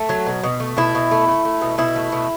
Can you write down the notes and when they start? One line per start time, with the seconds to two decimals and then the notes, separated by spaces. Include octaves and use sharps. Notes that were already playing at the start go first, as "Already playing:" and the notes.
Already playing: A3
0.09 F#3
0.26 B2
0.43 B2
0.60 A3
0.77 B2 E4
0.95 B2
1.11 A3
1.28 A3
1.45 A3
1.61 B2
1.78 B2 E4
1.96 A3
2.12 B2